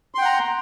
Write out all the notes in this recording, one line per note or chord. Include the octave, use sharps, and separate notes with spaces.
F#5 G5 A#5 C6